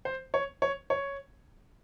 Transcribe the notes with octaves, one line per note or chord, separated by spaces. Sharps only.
C5
C#5
C#5
C#5